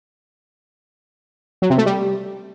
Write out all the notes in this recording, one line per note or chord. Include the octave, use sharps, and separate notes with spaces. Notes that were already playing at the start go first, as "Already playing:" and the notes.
F#3
C3
A3
G3